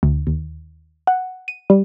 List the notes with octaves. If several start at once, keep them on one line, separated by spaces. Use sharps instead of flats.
D2
D#2
F#5
D#7
G3